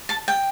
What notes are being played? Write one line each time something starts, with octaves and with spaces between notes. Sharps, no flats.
A5
G5